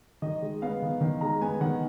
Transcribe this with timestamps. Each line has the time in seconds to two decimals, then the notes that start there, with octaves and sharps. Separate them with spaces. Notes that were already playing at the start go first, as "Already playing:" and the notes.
0.22 D#3 D#5
0.42 G#3
0.62 B3 F5
0.82 D#3
1.01 D#3
1.21 G#3 A#5
1.41 B3 G#5
1.61 D#3 F#5